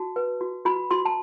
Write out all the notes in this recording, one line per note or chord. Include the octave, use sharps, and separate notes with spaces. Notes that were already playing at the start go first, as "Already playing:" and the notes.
Already playing: F#4 A5
B4
F#4
F#4 B5
F#4 C6
A5